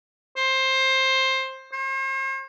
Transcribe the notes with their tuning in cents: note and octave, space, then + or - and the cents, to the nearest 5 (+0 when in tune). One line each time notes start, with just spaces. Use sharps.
C5 +15
C5 +45